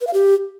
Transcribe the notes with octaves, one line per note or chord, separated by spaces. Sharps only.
B4
F5
G4